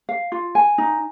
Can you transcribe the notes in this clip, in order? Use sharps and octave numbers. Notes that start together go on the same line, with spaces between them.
F5
F4
G#5
D#4